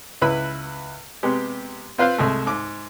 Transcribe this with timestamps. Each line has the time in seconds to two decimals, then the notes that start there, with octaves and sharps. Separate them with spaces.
0.22 C#2 E4 B4 B5
1.23 C3 G#3 B3 G4
1.98 C4 F4 B4 C5 F5
2.18 C2 G#3 A3
2.47 G#2 D6